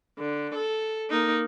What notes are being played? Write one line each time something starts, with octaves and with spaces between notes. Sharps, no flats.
D3
A4
A#3 D#4